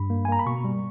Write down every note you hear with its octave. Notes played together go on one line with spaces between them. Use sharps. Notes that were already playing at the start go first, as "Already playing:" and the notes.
Already playing: G2 B5
A#3
G#5
A#3 A#5
B5
B2 C#6
G3